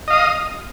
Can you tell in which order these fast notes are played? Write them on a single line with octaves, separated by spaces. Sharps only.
D#5 F5 D#6